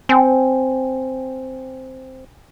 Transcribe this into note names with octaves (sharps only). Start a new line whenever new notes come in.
C4 G5 G#5